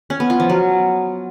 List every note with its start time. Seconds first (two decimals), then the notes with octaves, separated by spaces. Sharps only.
0.10 C#4
0.20 B3
0.30 F4
0.40 F3
0.50 F#3